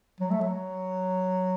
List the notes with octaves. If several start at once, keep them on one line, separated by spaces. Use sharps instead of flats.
F#3
A3
F#3